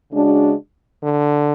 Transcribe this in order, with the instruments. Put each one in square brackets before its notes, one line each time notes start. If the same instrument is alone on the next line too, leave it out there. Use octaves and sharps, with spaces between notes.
[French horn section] C#3 G#3 D4 F#4
[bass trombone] D3